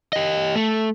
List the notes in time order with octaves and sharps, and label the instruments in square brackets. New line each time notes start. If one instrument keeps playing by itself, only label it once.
[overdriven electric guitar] G4 D#5
A3